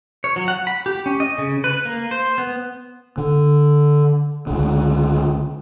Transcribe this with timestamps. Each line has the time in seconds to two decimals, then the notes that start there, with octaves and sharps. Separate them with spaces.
0.24 C#5
0.36 F#3
0.48 F#5
0.67 B5
0.86 G4
1.06 C#4
1.20 D#5
1.38 C#3
1.64 B4
1.85 A#3
2.11 C5
2.38 B3
3.18 D3
4.47 C#2 D3